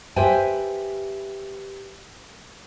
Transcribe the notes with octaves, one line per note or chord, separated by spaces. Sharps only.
G4 B4 C5 E5 G5 G#5